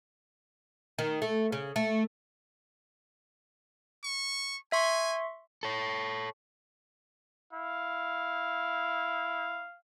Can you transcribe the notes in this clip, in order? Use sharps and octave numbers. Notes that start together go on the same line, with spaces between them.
D#3
A3
C#3
A3
C#6
E5 G#5 C6 C#6
A4 C#5
E4 F5